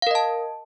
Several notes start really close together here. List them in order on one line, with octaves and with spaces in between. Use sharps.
F5 A#4 D#5 A5